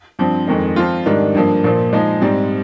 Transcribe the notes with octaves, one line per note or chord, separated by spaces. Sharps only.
G2 F3 C4
F2 D#3 G#3
F3 C4 F4
G#2 D#3 G3 D4
G2 F3 A#3
A#2 F3 A#3
F3 G#3 D#4
G#2 G3 C4